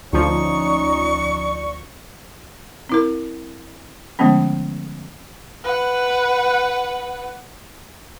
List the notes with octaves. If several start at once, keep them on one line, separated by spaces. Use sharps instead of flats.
D2 F3 C#4 D#4 D5 C#6
C4 E4 A#4
D3 F3 G#3 A3 B3 C#4
B4 F#5